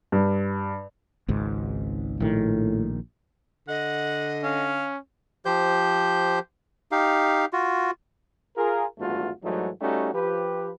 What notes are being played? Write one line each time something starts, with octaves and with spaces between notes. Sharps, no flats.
G2
G#1 C#2 G#2
A#1 A2 D#3
D3 D#5 F#5
C#4 F5
F3 G4 C5 G6
D#4 G4 F5
F4 F#4
F4 G#4 A#4
G#1 E2 G2 A3 F4 F#4
G#2 E3 F#3 G3 A3 D#4
G3 A3 C#4 D#4 F#4 G4
F3 G4 B4